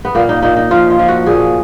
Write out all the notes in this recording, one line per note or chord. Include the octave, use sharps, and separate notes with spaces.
B3
A#2 A#3
D#4
A#2 D#4
D#4
F3 F4
F4
F3
F#4
A#2 G#4